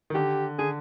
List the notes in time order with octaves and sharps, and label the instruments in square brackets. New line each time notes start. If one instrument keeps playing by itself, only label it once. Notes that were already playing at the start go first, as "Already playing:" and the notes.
[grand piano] D#3
[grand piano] D3 [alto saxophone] G4
[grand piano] D3 [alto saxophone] G#4